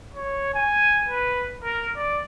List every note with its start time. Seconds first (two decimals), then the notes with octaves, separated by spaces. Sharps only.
0.14 C#5
0.54 G#5
1.08 B4
1.64 A#4
1.96 D5